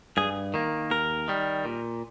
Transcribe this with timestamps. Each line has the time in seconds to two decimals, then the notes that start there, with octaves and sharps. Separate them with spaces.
0.17 G2 G#4
0.54 D#3 A#3
0.91 D#2 A#4
1.28 D#3 G3
1.65 A#2